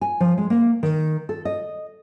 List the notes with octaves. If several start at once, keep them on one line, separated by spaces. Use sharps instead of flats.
G#5
F3
G#3
A#3
D#3
A4
D#5